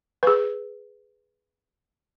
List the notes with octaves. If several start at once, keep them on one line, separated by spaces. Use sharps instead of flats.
G#4 B4